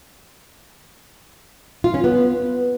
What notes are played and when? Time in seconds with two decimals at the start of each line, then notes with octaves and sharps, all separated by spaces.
1.84 F4
1.94 C#4
2.04 B3